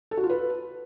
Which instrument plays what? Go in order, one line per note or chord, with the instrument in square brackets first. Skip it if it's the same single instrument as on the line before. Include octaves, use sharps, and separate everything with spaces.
[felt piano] A4
F#4
F4
B4